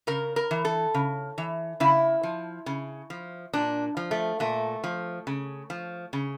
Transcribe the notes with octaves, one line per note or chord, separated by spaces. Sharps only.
C#3 A#4
A#4
E3
A4
C#3
E3
C#3 E4
F3
C#3
F3
A#2 D4
F3
A3
A#2 A3
F3
C#3
F3
C#3